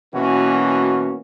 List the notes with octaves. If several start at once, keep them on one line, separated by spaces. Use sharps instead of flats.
B2 E3 A#3 C#4 F#4